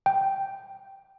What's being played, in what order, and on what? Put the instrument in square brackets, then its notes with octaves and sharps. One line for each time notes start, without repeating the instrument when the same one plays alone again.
[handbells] G5